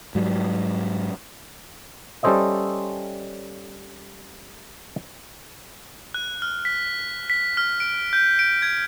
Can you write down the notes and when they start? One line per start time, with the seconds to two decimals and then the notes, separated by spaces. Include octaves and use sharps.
0.15 G#2 F#3 G3
2.23 G3 C#4 A4 C5 D#5 E5
6.14 F#6
6.42 F6
6.65 B6
7.30 B6
7.57 F6
7.80 D7
8.13 G6
8.39 D7
8.62 G#6